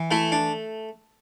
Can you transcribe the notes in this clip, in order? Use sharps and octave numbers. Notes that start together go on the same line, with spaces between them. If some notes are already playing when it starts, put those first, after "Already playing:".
Already playing: E3
A3 E4
D4